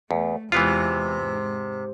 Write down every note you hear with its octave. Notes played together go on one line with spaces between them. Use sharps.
E2 A3
E2 C3 E3 G#3 B3 F4
G#2